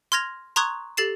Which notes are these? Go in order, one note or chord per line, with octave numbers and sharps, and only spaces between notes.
C6 F6 G#6 A#6 F7
A#5 C6 C#6 D#6 F#6 G#6
G4 A4 A6 C7 E7